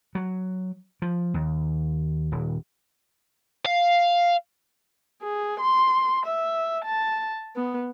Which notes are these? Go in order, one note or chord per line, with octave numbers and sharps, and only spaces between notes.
F#3
F3
D#2
D#1
F5
G#4
C6
E5
A5
B3